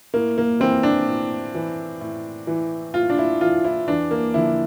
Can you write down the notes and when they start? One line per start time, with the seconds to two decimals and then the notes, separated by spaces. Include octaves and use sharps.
0.13 A2 A#3
0.38 A#3
0.60 E3 C4
0.83 D4
1.07 A2
1.55 E3
2.01 A2
2.47 E3
2.94 A2 F4
3.10 D4
3.18 E4
3.41 E3 F4
3.64 E4
3.88 E2 D4
4.11 A#3
4.34 D3 F3 E4